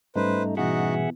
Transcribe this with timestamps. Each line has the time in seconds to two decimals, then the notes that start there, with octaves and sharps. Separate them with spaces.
0.16 G#2 G3 A3 C#4 D#4 B4 C5
0.57 B2 E3 D#4 F#4 G#4 E5 F#5